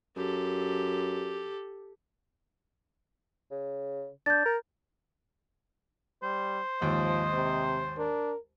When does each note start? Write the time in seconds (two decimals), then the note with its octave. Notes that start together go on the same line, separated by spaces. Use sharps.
0.17 F#2 G4 A4
3.51 C#3
4.26 D4 G6 A6
4.45 A#4
6.23 G3 C5
6.82 D#2 G#2 F3 D#5
7.33 C3
7.98 D4 A#4